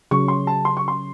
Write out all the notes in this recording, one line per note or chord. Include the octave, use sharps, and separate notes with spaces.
C#3 F#3 C#4 C#6
C6
A5
C6
C#6
C6